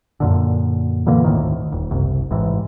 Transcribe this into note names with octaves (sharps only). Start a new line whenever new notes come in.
F#2 A#2 D3
A#2 D3 E3 A#3
G#1 D2 A2 D#3
D#1
F#1 C2
A1 G#2 E3